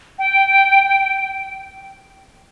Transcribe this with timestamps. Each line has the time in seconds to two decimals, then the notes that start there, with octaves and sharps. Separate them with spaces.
0.19 G5